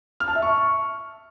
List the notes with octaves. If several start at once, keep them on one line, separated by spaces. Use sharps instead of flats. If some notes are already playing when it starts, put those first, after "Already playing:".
F6
A5
E5
C#6